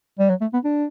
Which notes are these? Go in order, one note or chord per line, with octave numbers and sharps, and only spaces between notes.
G3
F#3
A3
B3
D4